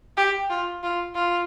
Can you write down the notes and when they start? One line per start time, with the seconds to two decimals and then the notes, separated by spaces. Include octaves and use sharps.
0.17 G4
0.50 F4
0.83 F4
1.15 F4